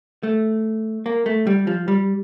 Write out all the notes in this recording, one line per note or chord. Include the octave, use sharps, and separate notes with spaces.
A3
A#3
A3
G3
F3
G3